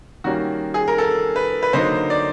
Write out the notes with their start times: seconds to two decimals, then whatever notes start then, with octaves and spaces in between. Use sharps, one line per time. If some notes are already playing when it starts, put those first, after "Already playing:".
0.24 D#3 G3 A#3 C#4 F#4
0.74 G#4
0.88 A#4
0.98 A4
1.36 B4
1.63 B4
1.73 D3 F#3 A#3 D#4 C5
2.10 D5